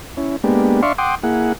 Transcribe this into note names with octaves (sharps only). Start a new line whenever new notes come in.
C#4 E4
G#3 A#3 B3 D4 G4
D4 D5 E5 F5 C6 C#6
F#5 G5 C6 D6 D#6
A#3 E4 G#4 F#5